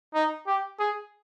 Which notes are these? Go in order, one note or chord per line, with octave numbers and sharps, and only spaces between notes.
D#4
G4
G#4